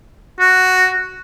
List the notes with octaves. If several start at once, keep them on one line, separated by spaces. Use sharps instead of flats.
F#4